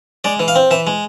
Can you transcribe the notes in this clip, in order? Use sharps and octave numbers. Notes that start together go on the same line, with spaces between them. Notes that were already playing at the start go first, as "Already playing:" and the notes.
G#3 D5
E3
F5
C4
E3 E5
G#3